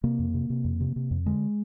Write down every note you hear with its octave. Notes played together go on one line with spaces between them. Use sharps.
C3 A#3
F2
C3
C3
F2
C3
C3
F2
D3 G#3